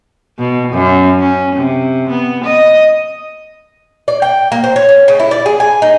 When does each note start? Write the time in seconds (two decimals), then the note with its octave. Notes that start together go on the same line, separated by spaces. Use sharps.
0.39 B2
0.72 F#2
1.19 C#4
1.55 C3
2.10 B3
2.44 D#5
4.08 D5
4.22 G5
4.52 A#3
4.64 C5
4.76 C#5
4.89 C#4
5.08 C#3
5.20 E4
5.31 D5
5.46 G#4
5.60 G#5
5.82 D#4